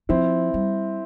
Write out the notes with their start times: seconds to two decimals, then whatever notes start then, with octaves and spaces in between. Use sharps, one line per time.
0.09 F3 C4 E4
0.54 G3